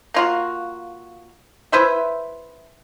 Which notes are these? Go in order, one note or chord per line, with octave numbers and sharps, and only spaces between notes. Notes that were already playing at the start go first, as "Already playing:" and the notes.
A#3 F4 F#4
E4 B4 C5 E5